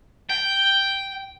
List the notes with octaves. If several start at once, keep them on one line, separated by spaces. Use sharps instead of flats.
G5